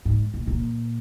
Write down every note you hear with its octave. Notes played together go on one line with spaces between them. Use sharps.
G#2
A#2
A#2